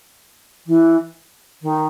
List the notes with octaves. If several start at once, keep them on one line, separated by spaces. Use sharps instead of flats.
E3
D#3